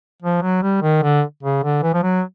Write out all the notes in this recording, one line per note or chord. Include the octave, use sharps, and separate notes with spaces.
F3
F#3
G3
D#3
D3
C#3
D3
E3
F3
F#3